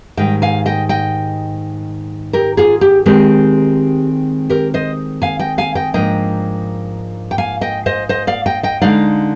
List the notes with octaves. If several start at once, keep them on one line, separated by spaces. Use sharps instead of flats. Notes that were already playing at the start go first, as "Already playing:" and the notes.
G#2 D#3 G3 D#5 G5
F5 G#5
D#5 G5
D#5 G5
G4 A#4
F4 G#4
G4
D#3 G#3 C4 G4
G4 A#4
C5 D#5
F5 G#5
D#5 G5
F5 G#5
D#5 G5
G#2 F3 A#3 D4 D#5 G5
G5
F5 G#5
D#5 G5
C5 D#5
C5 D#5
D5 F5
D#5 G5
D#5 G5
D3 G#3 D#4 D5 F5